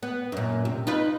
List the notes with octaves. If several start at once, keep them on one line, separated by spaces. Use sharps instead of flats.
B3
F#2 A#2
C3
D#4 F4 B4